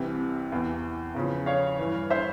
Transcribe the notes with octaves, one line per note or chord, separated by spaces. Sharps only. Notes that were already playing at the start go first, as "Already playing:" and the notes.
Already playing: C2 C3 E3
E2 E3
E2 C#3 F3
C#5 F5
G2 E3
C5 E5